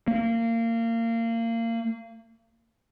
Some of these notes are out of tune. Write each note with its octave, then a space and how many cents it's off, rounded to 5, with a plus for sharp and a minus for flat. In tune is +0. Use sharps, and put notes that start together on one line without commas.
A#3 -25